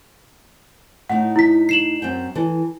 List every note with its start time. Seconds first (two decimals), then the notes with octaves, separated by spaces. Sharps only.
1.10 A2 D#4 F#5
1.36 E4 B6
1.69 C7 E7 F#7
2.02 F#2 C4 G5
2.35 E3 A4